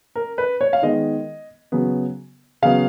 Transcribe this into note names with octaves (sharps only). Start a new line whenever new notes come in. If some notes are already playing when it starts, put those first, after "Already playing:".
A#4
B4
C#5
F5
D#3 G#3 B3 D#5
C#3 F#3 B3
C#3 F#3 B3 F5